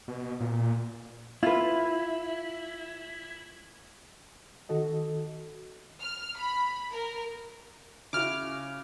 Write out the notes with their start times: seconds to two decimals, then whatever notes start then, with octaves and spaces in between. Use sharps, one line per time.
0.08 B2
0.41 A#2
1.43 E4 F4 B4
4.69 D#3 F#4 A4 D#5
6.00 F6
6.37 B5
6.91 A#4
8.13 C#3 E4 F#4 D6 F6